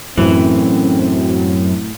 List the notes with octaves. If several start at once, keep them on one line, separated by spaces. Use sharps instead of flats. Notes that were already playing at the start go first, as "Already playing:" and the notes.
F#2 A2 E3 C4